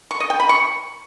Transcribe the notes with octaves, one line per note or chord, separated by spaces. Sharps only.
C#6
D#5
G5
B5
C#6